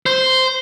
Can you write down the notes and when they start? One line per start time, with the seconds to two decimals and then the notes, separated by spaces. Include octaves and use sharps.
0.06 C5